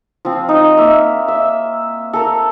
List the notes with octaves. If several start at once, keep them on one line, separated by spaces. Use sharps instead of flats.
F3 C4
D#4
A#3 E5
E5
A4 A#4